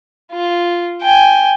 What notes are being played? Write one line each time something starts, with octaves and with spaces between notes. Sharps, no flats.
F4
G5 G#5